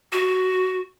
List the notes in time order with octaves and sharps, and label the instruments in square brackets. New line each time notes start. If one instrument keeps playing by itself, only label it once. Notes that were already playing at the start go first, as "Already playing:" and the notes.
[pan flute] F#4